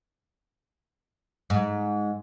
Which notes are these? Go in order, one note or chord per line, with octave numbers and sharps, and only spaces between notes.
G#2